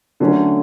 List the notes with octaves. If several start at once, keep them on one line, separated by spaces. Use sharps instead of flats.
D3 F#3 A3 C#4